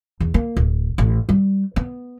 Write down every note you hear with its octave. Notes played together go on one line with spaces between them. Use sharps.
E2
A#3
D1
A1
G3
B3